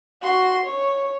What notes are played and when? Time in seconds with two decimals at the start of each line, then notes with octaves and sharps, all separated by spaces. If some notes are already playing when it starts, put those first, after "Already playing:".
0.22 F#4 C6
0.66 C#5